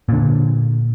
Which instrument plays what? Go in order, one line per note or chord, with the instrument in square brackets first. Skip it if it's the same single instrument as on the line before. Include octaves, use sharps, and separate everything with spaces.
[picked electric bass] A#2 D3